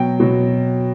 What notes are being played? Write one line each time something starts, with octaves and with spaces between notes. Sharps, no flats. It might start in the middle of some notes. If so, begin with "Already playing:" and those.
Already playing: B2 F#3 G5
B2 F#3